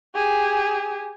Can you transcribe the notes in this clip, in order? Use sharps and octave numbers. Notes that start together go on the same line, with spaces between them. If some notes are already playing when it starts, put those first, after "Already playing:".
G4 G#4